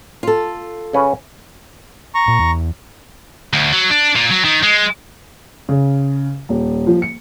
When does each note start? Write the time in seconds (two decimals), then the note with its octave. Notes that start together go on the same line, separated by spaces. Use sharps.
0.23 F4 A4
0.93 C#3 C#4 B4
2.15 A#5 C#6
2.28 A#2
2.39 E2
3.53 D2
3.73 F#3
3.91 D4
4.16 A#2
4.31 F#3
4.45 D#3
4.63 G#3
5.69 C#3
6.49 D#1
6.87 F3
7.02 C#7